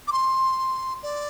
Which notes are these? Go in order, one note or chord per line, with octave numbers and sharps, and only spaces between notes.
D6
C6
D5